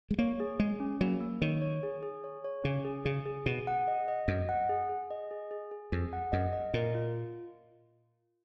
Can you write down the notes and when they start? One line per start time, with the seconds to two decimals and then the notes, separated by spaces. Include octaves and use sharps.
0.11 G#3
0.19 A#3 C#5
0.40 G#4
0.60 G#3 G#4
0.80 C#4
1.01 F#3 A#3
1.21 A#3
1.42 D#3 C#5
1.62 C#5
1.83 G#4
2.03 G#4
2.24 C#5
2.45 C#5
2.64 C#3 C#4
2.85 G#4
3.05 C#3 G#4
3.26 G#4
3.46 B2 G#4
3.67 F#5
3.88 D#5
4.08 D#5
4.28 F#2 D#5
4.49 F#5
4.69 G#4
4.89 G#4
5.11 D#5
5.31 G#4
5.51 G#4
5.71 G#4
5.92 F2 G#4
6.13 F#5
6.32 F#2 D#5
6.53 D#5
6.74 A#2 A#4
6.95 F4